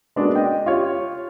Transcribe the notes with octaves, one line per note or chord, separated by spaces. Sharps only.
G#3 A#3 B3 C#4 D4 F#4
D#5 G5
F4 G4 C#5